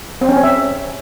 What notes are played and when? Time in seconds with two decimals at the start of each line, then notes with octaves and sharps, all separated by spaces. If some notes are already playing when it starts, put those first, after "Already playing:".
0.21 C4
0.29 C#4
0.36 C4
0.43 E5